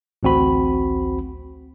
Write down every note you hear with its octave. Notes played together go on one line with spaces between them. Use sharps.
A1 D2 C4 F#4 B5